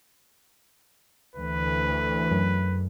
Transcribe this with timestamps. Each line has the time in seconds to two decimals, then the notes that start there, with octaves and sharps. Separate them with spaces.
1.36 D2 E3 B4
2.31 F#2